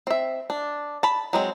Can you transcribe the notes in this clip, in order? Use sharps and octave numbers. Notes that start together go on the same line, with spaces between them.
C4 E5
D4
A5 B5
F#3 G#3 C4